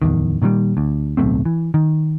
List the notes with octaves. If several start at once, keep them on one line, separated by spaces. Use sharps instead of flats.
D1 B1 E2 D#3
A#2 D#3 F#3 G3
D2
D1 B1 A3 C4
E3
D#3